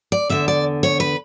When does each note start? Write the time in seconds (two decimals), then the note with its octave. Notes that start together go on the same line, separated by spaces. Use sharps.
0.12 D5
0.29 E2 D3 E5
0.48 D5
0.83 C#5
1.00 B4